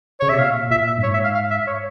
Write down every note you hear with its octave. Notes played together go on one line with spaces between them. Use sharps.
C#3 C#5
C3 E5
A#2 F5
A#2 E5
E5
G2
G#2 C#5
E5
F5
F5
E5
C#5